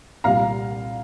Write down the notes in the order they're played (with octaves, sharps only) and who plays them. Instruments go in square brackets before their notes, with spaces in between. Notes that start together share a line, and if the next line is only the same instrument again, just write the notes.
[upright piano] C2 A#2 G3 F5 A#5